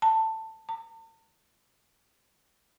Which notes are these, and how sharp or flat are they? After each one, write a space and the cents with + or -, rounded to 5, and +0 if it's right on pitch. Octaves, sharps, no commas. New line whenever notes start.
A5 +15
A5 +45